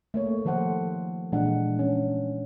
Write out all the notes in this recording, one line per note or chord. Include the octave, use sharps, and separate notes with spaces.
A3 A#3 C#5
D#3 F3 A4 C5 F#5
A#2 E3 G#3 D4 F#5
C#4